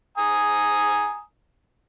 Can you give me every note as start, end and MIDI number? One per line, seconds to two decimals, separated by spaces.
0.17 1.21 80
0.17 1.21 82
0.17 1.21 87